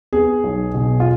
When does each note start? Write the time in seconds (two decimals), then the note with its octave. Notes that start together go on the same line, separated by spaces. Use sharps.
0.13 B3 G#4
0.44 B1
0.74 B2
1.00 F4